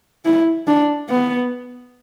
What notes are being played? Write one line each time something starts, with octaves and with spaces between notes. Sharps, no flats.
E4
D4
B3